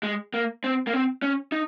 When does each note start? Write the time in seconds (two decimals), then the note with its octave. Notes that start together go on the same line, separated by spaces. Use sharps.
0.03 G#3
0.34 A#3
0.64 C4
0.87 A#3
0.93 C4
1.22 C#4
1.52 D#4